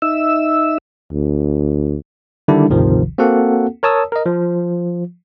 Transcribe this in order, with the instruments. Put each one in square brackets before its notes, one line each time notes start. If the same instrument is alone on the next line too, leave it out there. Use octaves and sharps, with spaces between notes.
[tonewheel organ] D#4 E5 E6
[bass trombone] D2
[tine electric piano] D3 D#3 G3 D4 E4
G#1 D2 C3 D#3 F3
A#3 C4 F#4 A4 F#5
A#4 C#5 A5 D#6 E6
A#4 D#5
F3